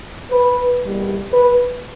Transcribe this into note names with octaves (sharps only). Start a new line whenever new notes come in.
B4
E2 B2 G3 A#3
B4